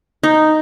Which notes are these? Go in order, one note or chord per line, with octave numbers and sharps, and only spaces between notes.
D#4